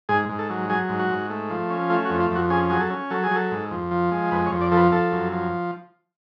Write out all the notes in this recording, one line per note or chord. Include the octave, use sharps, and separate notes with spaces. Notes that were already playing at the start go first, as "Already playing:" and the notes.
G#2 G#4
G#2
A4
F#3
F#3 G#4
G#2
F#4
G#2
A3
F3
C#4
A3 F4
F#4
F2
F4
F2 F#4
C#4 G#4
F#3 G#4
A4
C#4
F#3 A4
G#4
F#3 A4
G#2
F2
F3
G#3
F2 B4
C#5
F2
D5
F3 A4
B4
F3 A4
F#2
F3